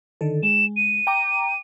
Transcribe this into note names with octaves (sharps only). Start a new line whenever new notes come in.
D3 D#3 A4
G#3 E7
D#7
G5 A#5 D6